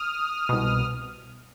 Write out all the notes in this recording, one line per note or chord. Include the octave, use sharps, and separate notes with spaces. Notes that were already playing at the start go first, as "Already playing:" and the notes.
Already playing: D#6 F6
C2 B2